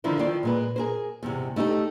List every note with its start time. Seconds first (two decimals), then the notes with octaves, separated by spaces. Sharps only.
0.04 D3 D#3 F3 E4 F4
0.19 D#3 F3 E4 D5
0.43 A#2 G#3 B4
0.76 G#4 A#4 C5
1.23 E2 G#2 C3
1.56 A3 D#4 E4 G4 A4